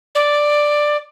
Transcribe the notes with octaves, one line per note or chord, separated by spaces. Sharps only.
D5